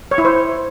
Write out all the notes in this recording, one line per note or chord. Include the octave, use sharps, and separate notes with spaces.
C#5
E4
C5